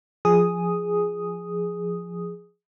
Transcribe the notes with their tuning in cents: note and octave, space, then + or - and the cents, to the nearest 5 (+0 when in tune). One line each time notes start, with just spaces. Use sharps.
F3 +0 G#4 +0 D#6 +0